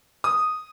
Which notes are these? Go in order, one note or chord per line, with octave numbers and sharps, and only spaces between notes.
D#6